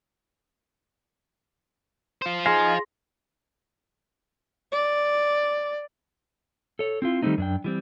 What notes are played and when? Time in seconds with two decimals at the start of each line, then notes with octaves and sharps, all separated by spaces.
2.22 F4 C5
2.46 D#4 G#4 F5 G#5 C6 A#6
4.72 D5
6.79 A4 C#5
7.02 C4 E4 F4
7.22 D#3 G3 A3 B3 C4 D#4
7.38 F#2 D4 G5
7.64 E3 G3 C4